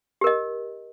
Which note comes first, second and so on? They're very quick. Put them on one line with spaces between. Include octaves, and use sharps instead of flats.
G4 A#4 D#5